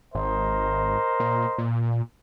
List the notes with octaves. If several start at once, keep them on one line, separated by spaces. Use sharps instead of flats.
G#1 A#4 C5 D#5
A#2
A#2